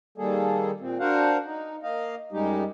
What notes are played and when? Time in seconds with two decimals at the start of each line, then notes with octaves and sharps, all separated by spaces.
0.18 D#3 G3 A#3 G#4 A4
0.81 A#2 C4
1.00 D4 F#4 A#4 C5 F5 F#5
1.45 D#4
1.83 A#3 D#5 F5
2.32 F#2 G3 G#3 D#4 G4